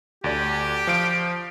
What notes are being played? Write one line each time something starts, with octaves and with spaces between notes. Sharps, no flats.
D2 G4 D5
F3 F5 D7